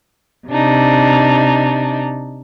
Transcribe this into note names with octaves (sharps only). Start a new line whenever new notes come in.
C3 D4 D#4